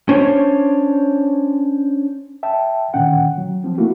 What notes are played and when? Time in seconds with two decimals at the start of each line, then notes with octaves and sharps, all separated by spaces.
0.09 C#4 D4 C5 C#5
2.43 E5 G5 A5
2.94 A#2 D3 D#3 C#4 F#5 G5
3.38 F#3
3.64 F3 C4
3.78 A3 A#3 E4 F#4